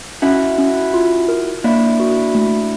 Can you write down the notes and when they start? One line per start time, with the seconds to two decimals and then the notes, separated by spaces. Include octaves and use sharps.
0.22 C#4 E4 F#4
0.58 C#4
0.94 F4
1.28 A#4
1.64 A#3 D4 E4
2.00 F#4
2.35 A3